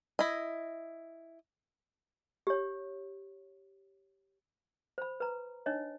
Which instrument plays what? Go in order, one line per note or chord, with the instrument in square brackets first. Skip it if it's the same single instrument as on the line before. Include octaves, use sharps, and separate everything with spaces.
[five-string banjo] E4 D#5
[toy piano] G4 C#5
C5 B5
B4 A#5
D4 D#4 C#5 D#5